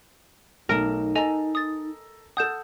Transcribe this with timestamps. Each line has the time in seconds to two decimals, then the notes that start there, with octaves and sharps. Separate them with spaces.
0.69 B1 A3 D#4 A#4 E7
1.15 A4 D#5 G#5 A#5 F7
1.55 D#6 A6
2.37 A4 F#5 D#6 G6 E7